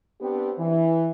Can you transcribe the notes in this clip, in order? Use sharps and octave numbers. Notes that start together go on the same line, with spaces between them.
B3 C4 D4 G4
E3